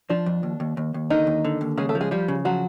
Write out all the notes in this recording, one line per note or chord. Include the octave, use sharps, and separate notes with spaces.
F3 D4
F2
D#2
D#2
D#2
D#2
D3 D#3 D#4
D#2
D3
D#2
C#3 G#3 G#4
A3 A4
F3
G#3 G#4
F3 G3 G4
C#3
F3 F#3 F#4